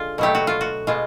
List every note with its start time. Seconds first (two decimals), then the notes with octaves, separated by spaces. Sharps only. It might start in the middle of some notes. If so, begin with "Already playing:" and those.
Already playing: D3 G#3 F4
0.18 B2 F#3 A3 G4
0.35 F#4
0.47 F4
0.61 F#4
0.87 B2 G#3 F4